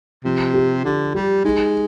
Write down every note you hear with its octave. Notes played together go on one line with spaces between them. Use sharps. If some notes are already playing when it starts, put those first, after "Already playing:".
C3 F3
G4
D3 G4
G3 G4
G#3 D#4